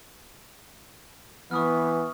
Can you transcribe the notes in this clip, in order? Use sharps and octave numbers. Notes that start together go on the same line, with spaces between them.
E3 B3 C#6 D#6 F6